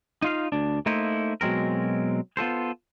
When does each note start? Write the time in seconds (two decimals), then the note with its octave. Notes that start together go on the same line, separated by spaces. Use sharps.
0.22 D#4 F4 F5
0.52 D2 D4
0.86 A3 A#3 D#4 E4 C5
1.41 B2 F#3 G#3 C4 A#4
2.37 B3 F4 A4 C5